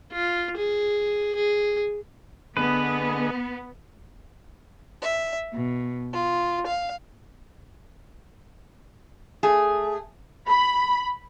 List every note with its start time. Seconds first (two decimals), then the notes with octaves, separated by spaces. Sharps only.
0.12 F4
0.57 G#4
1.35 G#4
2.57 D3 B3 G#4 B4 D#5
5.02 E5
5.52 B2
6.12 F4
6.67 F5
9.43 A3 G#4
10.49 B5